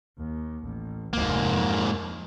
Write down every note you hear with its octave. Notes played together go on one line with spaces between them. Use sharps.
D#2
A1
F1 D2 G#2 A#3
F2 F3